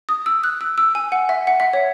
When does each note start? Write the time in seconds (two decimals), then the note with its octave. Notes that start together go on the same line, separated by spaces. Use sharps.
0.09 D#6
0.26 E6
0.44 F#6
0.61 E6
0.78 E6
0.95 G#5
1.12 F#5
1.29 E5
1.47 F#5
1.60 E5
1.73 C#5